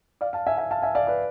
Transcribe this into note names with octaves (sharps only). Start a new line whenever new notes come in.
D5 F5
F5 A5
E5 G#5
E5 G#5
F5 A5
E5 G#5
D5 F5
B4 D5